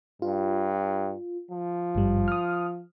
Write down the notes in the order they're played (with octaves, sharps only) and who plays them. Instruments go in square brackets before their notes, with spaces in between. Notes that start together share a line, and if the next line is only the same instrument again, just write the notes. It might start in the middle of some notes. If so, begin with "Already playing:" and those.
[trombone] G2 [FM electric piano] F4
[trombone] F3
[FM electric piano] G#1 G2 G3
D#6 F6